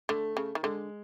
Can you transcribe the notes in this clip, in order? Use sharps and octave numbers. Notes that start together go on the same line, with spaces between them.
D3 A3
C#3
D#3
D3 G#3